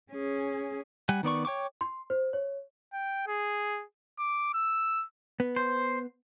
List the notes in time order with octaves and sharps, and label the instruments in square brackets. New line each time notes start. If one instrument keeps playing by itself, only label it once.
[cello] C#4 G#4
[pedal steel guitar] G3 F#5 G#5
D#3 B3 D5 C#6
C#5 G5 C#6 D6
[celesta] C6
C5
C#5
[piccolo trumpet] G5
G#4
D6
E6
[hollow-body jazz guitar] B3
[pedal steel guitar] C5